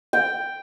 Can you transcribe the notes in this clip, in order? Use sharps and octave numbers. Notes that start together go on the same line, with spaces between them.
G5